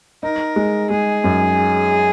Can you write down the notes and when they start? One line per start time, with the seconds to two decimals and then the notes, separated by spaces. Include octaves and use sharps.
0.23 D#4 A#4
0.56 G#3
0.90 G#3 G#4
1.24 F#2